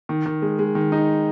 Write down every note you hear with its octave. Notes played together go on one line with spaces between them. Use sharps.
D#3
D#3
G#3
G#3
D#3
D#4